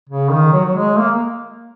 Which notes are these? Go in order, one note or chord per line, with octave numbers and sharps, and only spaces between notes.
C#3
D#3
F#3
F#3
G#3
A#3